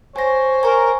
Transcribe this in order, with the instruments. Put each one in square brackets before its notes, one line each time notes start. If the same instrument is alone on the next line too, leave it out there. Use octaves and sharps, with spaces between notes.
[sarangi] C5 [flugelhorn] C#5 [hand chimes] G#5 A#6
[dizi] A#4 [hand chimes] G#5 A#5 C#6